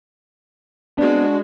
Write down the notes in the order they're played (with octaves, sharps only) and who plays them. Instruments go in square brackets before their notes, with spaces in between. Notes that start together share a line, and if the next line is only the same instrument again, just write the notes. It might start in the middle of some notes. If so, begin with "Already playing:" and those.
[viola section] G#3 F#4 [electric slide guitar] B3 C4 [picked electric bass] D4 [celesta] D5